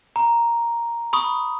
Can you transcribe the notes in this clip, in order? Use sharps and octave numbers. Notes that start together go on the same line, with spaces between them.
A#5
B5 C#6 D#6